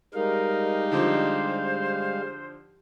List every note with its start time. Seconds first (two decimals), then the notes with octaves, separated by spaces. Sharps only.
0.14 G3 G#3 D#4 G4 A#4 F5
0.92 D3 F3 C5